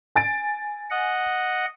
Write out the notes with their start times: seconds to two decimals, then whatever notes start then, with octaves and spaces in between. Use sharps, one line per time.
0.15 G#5 A6 D7
0.90 D#5 F#5